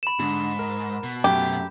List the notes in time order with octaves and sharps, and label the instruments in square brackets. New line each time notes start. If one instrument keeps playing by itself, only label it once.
[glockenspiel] B5 E7
[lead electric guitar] G#2 [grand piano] D3
[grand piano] A#4
[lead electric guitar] B2
[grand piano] F#2 A3 [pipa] G4